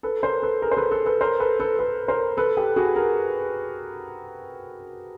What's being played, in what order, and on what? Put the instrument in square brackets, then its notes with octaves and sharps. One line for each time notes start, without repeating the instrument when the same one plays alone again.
[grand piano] A4 B4
A#4 C5
A4 B4
G#4 A#4
C5
A4 B4
A4 B4
A4 B4
A#4 C5
A4 B4
A4 B4
A4 B4
A#4 C5
A4 B4
G4 A4
F#4 G#4
G#4 A#4